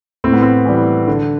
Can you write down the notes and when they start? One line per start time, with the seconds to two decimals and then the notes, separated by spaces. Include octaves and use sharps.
0.24 A2 C4
0.33 B3
0.42 C4
0.65 E3 G3
1.08 D3